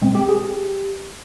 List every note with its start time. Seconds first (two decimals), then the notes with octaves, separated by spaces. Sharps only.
0.01 A#2 G#3 C4
0.15 G4
0.29 G#4
0.42 G4